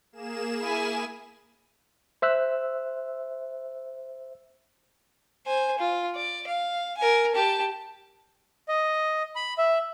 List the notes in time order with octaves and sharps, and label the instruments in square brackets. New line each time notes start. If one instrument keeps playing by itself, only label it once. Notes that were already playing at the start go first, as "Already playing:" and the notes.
[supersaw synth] A#3 G#4 E7
[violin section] E4 G#5
[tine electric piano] C5 E5 E6 F#6
[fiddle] C5 G#5
F4
D5
F5
A#4 G#5
G4 A5
[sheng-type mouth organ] D#5
B5
E5